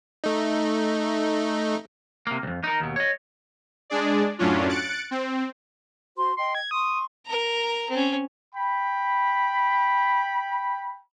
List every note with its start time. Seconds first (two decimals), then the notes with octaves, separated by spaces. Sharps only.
0.24 A3 D#4
2.27 C3 A#3
2.43 C2 F2
2.64 D#4 A#4
2.80 D#2 B2
2.96 C#5 D#5
3.90 G#3 D4 G#4 D5
4.39 F#2 A2 F#3 C#4 D4 F4
4.69 F#6 A6 C#7 D7
5.11 C4
6.16 F#4 C5 C6
6.37 D#5 G5 C6
6.55 G#6
6.71 C6 C#6 D#6
7.26 A#4 A#5
7.90 C4 C#4
8.55 G5 B5